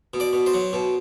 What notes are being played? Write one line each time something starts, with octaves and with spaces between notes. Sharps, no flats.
B2
D5
B2
C5
F#3
B2